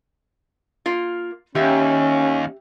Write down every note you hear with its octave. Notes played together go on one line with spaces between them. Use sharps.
A#3 F4
D#2 C#4 G4 E5